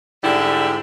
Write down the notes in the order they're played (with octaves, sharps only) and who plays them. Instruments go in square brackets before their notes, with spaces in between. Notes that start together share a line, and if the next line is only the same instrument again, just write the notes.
[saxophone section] G#2 D3 G3 E4